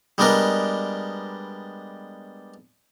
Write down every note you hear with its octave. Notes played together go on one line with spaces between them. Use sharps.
G3 G#3 B3 D4 A#4 D#5